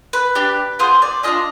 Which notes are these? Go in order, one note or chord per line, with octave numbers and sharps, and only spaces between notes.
B4
D4 G4
B3 F4 G#4 C5
D5
D4 F4 G#4 D#5